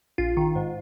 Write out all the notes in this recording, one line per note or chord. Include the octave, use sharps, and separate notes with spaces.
A#1 F4
D#3
G#2